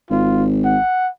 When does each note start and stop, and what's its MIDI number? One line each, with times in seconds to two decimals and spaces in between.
0.11 0.77 32
0.11 0.46 65
0.65 1.09 78